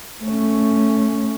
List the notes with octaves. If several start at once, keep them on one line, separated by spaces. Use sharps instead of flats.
A3 C#4